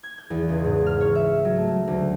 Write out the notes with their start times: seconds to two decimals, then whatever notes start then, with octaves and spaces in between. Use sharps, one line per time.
0.03 G#6
0.18 G6
0.30 E2
0.49 C#2
0.64 G#2
0.86 F6
1.00 C#5
1.15 E5
1.44 F#3
1.57 A3
1.87 D2